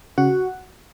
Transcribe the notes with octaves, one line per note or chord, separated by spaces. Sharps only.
C#3 F#4 F#5